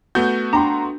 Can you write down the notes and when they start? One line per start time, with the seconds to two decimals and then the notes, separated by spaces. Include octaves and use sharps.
0.15 A3 B3 F#4 G6
0.53 D4 G5 A#5 C6